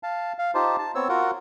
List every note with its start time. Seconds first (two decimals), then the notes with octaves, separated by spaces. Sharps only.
0.03 F5 A5
0.38 F5
0.55 D#4 F4 G4 C5 A5
0.78 A5
0.95 B3 C4 C#5 E6
1.09 F4 F#4 A#4 F#5